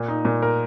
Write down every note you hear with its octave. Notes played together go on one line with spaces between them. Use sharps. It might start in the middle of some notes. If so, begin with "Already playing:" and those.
Already playing: A#2
D#4
A#2
A#4